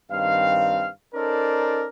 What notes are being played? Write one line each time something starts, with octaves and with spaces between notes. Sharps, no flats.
G2 D#3 C4 F5
C#4 D#4 A4 A#4 C5 D5